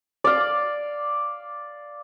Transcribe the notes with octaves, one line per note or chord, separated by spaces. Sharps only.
D5 F5